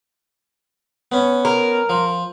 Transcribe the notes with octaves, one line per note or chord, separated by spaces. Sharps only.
B3 C#4
A#4
F3